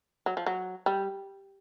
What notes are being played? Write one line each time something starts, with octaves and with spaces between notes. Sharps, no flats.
F#3
F3
F#3
G3